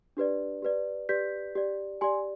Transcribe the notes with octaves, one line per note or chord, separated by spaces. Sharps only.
D4 G4 B4 D5
G4 B4 D5
G4 B4 D5 G6 B6
G4 D5
G4 D5 G#5 C6